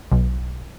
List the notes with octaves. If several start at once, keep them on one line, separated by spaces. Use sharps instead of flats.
B1